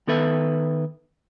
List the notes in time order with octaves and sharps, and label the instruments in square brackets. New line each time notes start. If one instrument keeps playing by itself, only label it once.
[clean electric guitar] D#3 B3 A4 B4 E5